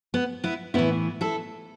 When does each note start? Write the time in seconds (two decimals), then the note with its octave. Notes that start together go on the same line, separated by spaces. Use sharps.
0.14 B3
0.44 B3 E4
0.74 A2 E3 B3 E4
1.21 E4 A4